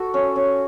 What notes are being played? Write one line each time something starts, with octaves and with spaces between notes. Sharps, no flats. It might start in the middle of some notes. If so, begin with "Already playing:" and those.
Already playing: F#4 A4
C#4
C#4